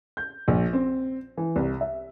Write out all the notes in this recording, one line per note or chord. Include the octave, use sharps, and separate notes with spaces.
G6
A#1
C4
E3
C2
E5